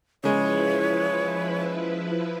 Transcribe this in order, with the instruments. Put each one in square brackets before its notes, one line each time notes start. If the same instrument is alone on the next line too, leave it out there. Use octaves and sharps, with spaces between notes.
[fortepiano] C#3 G#3 [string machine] F3 E4 B4 [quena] C#5